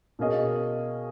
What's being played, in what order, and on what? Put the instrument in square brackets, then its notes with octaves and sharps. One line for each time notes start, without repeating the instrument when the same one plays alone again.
[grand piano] B2 A#3 C#4 G#4 D#5